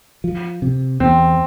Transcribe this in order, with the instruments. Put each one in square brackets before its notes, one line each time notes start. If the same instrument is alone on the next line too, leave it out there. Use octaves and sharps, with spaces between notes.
[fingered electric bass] F3
C3
[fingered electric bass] E2 [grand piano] C4